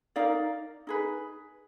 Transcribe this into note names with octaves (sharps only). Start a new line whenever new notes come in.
D#4 A#4 D5 F5
D#4 G#4 B4